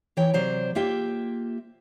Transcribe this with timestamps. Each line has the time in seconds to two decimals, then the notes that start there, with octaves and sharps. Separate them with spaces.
0.17 E3 E4 C#5 G5
0.34 C3 F#3 C5 D5 A#5
0.75 A#3 F4 G4 E5 G5